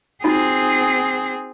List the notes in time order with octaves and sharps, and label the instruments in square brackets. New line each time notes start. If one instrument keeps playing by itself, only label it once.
[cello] C4 G#4 [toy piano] D#4 F4 F#4